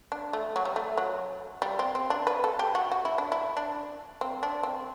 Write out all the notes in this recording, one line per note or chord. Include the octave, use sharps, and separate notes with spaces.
D4
A3
F#3
G3
A3
F#3
G3
C4
C4
D4
B4
A4
G4
F#4
F#4
E4
D4
E4
D4
C4
D4
C4